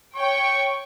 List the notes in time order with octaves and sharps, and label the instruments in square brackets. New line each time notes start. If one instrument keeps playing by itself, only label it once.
[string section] C#5 G5 [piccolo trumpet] C#6